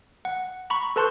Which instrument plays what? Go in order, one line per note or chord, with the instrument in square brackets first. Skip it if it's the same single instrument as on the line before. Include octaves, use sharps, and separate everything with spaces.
[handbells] F#5
A#5 B5 C#6
A4 B4 A5 C6 C#6 G6